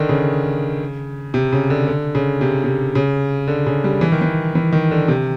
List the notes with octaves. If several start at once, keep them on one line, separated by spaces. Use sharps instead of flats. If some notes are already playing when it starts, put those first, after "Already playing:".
Already playing: D3 D#3
C#3
C3
C#3
D3
D3
C#3
C3
C3
C#3
D3
C#3
G3
E3
D#3
E3
E3
D#3
D3
C3